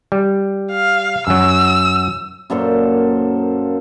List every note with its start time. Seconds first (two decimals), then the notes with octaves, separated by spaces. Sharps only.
0.12 G3
0.72 F5
1.27 F#2 F#3 E6
2.50 F#2 A#2 A4 C5